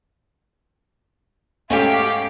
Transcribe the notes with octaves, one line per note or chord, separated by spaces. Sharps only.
G#2 A3 C#4 G4 F5